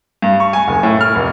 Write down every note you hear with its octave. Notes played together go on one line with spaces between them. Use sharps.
G2
C#6
G#5
F#1
A2
F6
F1